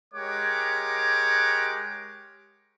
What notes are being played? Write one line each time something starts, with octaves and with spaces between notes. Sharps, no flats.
G#3 G4 A#4 C#5 F#5 D6